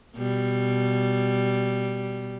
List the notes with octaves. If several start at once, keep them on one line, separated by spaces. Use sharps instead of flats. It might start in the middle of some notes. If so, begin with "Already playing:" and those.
B2 G3